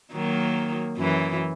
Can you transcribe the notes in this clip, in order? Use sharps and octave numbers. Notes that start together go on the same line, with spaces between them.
D#3 F#3 A#3
F#2 E3